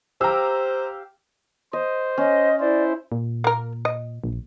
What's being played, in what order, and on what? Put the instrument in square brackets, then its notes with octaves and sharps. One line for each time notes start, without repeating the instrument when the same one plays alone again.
[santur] G4 F5 G5 [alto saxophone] C5 [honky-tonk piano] A#5 E6
[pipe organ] C5 [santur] D#5
[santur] C#4 [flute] D#5
[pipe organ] E4 C5 [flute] D5
[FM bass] A#2
[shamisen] A#3 A#4
D#5
[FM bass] A#1